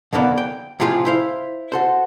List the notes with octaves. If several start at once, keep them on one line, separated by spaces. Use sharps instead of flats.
B1 F2 D3 A#3 B3 D5
G5
A2 C3 F3 F4 G4 G#4
E4 C5 F5
F#4 A4 C5